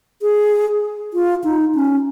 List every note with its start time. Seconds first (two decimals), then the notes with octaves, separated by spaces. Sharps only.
0.22 G#4
1.14 F4
1.44 D#4
1.75 C#4